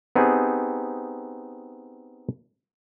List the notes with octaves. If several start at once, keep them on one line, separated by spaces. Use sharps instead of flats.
B3 C4 D#4 G4 G#4